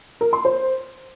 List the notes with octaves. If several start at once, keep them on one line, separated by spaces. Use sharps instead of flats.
A#4
C6
C5